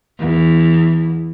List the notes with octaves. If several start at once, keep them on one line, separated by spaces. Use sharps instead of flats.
E2